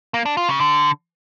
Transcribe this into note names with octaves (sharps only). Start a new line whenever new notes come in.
A#3
D4
F4
C#3
D3